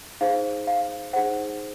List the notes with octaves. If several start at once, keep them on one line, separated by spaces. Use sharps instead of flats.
D#4 G#4 C5 F5
F5
D#4 G#4 C5 F#5